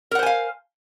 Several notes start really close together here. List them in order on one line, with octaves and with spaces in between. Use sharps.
A#4 F#5 C5 G#5 F5